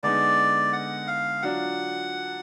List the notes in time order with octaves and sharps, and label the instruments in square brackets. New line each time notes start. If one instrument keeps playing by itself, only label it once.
[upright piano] D3 G#3 B3 D#4 [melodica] D5
[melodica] F#5
F5
[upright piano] F#3 D4 F4 [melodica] F#5